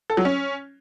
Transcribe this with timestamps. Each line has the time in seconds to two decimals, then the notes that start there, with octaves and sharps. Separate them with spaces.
0.10 A4
0.17 F#3
0.25 C#4